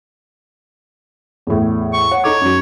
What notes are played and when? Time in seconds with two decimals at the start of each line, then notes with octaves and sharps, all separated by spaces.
1.47 E2 A2
1.93 C#6
2.11 C#5 F#5
2.24 D#4 A4 C#5 D6
2.41 F#2 F#3